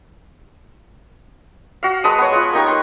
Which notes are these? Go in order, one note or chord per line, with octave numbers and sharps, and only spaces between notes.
F#4 F5
G#3 B4 A5 D#6
B3 C#5
G#3 F4
A#3 D#4 G4 C#6
B4 C6